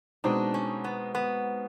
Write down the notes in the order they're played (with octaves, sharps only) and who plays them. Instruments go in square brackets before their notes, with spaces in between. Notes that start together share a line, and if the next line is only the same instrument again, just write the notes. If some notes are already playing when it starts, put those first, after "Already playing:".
[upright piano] B2 G#3 C4 D#4 [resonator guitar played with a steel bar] D4
[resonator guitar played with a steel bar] C#4
B3
B3